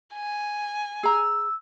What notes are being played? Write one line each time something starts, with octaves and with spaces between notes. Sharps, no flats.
G#5
G#4 A#5 E6